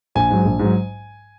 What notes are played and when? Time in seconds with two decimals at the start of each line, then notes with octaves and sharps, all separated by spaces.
0.15 A#1 G#5
0.30 G#2 F#3
0.45 A#1
0.59 G#2
0.64 F#3